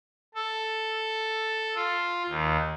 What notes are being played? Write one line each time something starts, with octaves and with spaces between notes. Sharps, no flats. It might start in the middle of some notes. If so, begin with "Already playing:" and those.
A4
F4
D#2